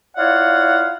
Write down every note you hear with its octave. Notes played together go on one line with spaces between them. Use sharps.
E4 F4 C#5 D5 F5 F#5